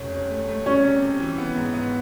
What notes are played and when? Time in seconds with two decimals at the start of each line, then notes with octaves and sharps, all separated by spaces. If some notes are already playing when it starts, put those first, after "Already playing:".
Already playing: F1 C#4
0.12 C#4
0.30 A3
0.48 A3
0.66 G3 C#4
0.84 C3
1.02 C3
1.20 E3
1.38 B3
1.56 G#2
1.74 B3